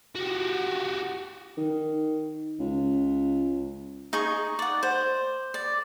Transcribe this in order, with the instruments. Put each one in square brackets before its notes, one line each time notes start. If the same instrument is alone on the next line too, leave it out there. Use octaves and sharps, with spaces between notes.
[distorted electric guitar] F#4 G4
[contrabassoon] D#3
C#2
[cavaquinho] D#4 G#4 C#6
D5 F#5
C5
D5